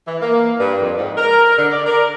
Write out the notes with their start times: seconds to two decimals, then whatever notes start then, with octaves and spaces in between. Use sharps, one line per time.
0.07 E3
0.21 A#3
0.58 G2
0.81 F2
0.98 G#2
1.17 A#4
1.58 D3
1.72 D5
1.86 A#4